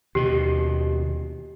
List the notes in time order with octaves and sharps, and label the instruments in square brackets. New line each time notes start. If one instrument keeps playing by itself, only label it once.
[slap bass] D#2 B2 [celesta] G4